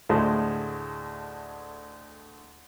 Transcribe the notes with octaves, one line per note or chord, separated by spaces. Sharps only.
D2 A2 G#3 C5